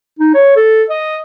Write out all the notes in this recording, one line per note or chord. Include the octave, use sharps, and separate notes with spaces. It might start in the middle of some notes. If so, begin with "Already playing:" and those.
D#4
C#5
A4
D#5